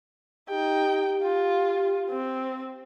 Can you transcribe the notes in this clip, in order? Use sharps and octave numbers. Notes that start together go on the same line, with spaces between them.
D#4 G4 G5
F4
C4